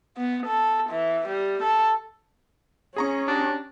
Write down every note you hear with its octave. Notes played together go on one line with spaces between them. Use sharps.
B3
A4
E3
G3
A4
C#4 G#4 A#5 C#6
D4 F#4 G4